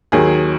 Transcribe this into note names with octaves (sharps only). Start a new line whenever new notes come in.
D#2 D#3 F#3 G#4